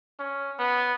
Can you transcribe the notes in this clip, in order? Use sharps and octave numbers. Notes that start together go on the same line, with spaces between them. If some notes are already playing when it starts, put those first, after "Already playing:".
C#4
B3